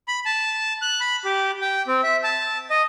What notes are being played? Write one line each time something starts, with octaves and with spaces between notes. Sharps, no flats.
B5
A5
F#6
B5
G4
G5
C4
E5
A5
D#5